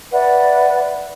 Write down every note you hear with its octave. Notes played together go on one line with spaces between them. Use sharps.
B4 D5 E5 F#5